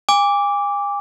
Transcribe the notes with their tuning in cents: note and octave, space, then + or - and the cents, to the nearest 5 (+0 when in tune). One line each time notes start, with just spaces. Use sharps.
G#5 -40 D6 -10